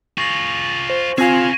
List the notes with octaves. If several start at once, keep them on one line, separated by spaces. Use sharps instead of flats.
F4 G#4 C#6 A#6 F#7
C5
C4 F4 G#4 F5 G#5 G#6 A#6 C7